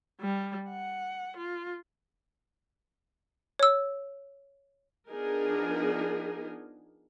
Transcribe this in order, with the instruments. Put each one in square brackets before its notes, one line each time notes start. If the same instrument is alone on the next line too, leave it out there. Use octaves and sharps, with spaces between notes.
[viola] G3
F#5
F4
[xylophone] C#5 E6
[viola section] F3 B3 D4 D#4 G#4 A#4